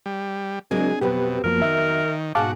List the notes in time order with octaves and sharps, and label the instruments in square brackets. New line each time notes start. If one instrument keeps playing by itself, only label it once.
[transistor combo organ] G3
[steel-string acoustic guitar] C#3 F#3 G#3 [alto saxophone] A#3 [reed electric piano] C4 D4 [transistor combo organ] G#4
[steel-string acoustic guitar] F2 F#3 B3 [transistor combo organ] B2 [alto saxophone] C4 [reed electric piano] G4 B4
[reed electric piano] F#2 F3 A#3 [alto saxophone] A#4
[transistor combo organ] D#3 [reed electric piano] E5
[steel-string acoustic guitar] G#2 B2 G#4 [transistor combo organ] F#4 [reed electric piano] F5 A5 D6